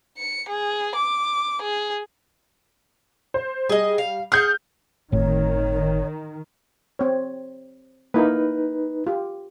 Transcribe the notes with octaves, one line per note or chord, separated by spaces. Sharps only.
C#7
G#4
D6
G#4
C5
G3 G#4 D#5
F5
G#4 F#5 F6 G6
G1 A2 D#3 A3 C4 C#5
C4 C#5
A#3 D#4 E4 A#4 B4
F4 G4